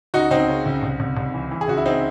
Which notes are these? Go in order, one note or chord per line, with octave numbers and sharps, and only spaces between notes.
C#2 D#4 F#4
C#2 C4 D#4
C#3
C#2
C2
C2
C2
E3
E3
G#4
C#2 F#4
E4
C4 D#4